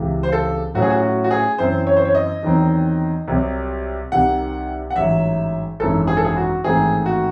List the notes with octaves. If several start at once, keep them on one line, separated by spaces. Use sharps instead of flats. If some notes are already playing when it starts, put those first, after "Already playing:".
Already playing: C#2 C3 E3
C5
A4
A2 F#3 C#4 F#4
G#4
F#4
F#4
F#4
G#4
F#2 E3 C4 E4 C5
C#5
C5
C#5
D#5
E2 D#3 F#3 C4 D#4
C2 C3 F#3
C2 C3 D#3 F#5
F#5
A1 G#2 F#3 E5
G#1 F#2 E3 G#3 D#4 A4
G#4
A4
G#4
F#4
A1 G#2 D#3 A3 C4 G#4
F#4